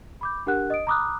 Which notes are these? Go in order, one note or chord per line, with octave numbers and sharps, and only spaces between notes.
B5 D6 G6
D4 G4 A#4 F#5 F#6
D#5 D#6 D7
A#5 B5 D6 D#6 F6 F#6